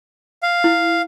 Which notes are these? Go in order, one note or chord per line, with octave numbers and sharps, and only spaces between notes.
F5
E4